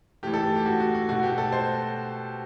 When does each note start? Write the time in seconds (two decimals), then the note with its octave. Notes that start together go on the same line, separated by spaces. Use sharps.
0.23 A2 E3 A3 G4
0.34 A4
0.44 G4
0.56 G4
0.66 F#4
0.80 F#4
0.95 F#4
1.09 B2 A3 F#4
1.23 G4
1.38 A4
1.52 C5